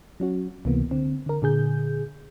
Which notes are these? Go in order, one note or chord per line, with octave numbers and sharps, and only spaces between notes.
F#3 C#4 F#4
C#2 C3 E3 A#3 B3
D3 C4
D3 A#4
A#2 D3 G#4 G6